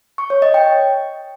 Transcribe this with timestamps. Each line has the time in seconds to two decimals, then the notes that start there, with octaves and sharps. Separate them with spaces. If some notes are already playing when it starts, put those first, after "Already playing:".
0.18 C#6
0.30 C#5
0.42 D#5
0.54 G5